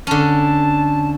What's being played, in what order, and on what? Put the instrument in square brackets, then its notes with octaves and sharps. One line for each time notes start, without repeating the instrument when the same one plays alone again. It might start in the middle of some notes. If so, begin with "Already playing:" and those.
[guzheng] D3 C#4 [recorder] A5